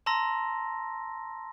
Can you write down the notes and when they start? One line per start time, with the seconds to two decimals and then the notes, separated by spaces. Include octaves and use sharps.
0.06 A5 A#5 C6 E6 A#6